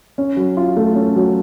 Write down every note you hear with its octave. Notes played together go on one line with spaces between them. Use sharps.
C#4
F#3
F4
A3
C#4
F#3